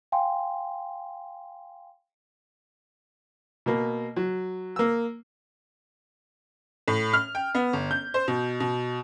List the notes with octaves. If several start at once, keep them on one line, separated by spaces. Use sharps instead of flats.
F5 G5 G#5 C6
B2 A#3
F#3
A#3 E6
A2
F6
G5
B3
G1
G6
C5
B2
B2